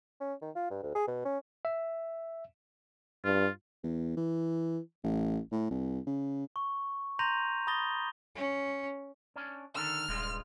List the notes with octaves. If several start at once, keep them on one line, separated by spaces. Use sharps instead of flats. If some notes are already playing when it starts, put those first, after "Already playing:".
C#4
D#3
F4
G2
D2
G#4
B2
C#4
E5
G2 F4
E2
E3
A1
A2
C2
C#3
C#6
A#5 C6 G6 A#6 D#7 F7
B5 D#6 A6 A#6 G7
C#4
C#4 D4
D3 D#3 A4 F6
D#1 G2 G#3 F4